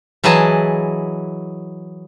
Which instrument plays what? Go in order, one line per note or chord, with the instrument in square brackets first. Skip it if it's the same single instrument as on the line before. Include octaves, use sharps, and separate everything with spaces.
[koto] E3 F#3 E4 G#4 D#5 A5